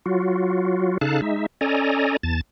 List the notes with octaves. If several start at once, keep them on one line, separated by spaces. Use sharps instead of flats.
F#3 F4 F#4
C#3 D#4 A4 F5 A5 F#6
G#3 D#4 E5
C#4 A4 D5 D#5 G#5 A#5
E2 A5 A6